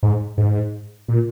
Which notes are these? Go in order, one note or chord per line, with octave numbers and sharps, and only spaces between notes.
G#2
G#2
A#2